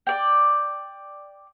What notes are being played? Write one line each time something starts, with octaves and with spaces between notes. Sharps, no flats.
D5 G5